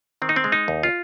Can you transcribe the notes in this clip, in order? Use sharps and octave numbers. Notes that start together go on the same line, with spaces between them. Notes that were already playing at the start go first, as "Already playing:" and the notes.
D#3 C4
D#4
C4
G#3
D#4
D#2
F4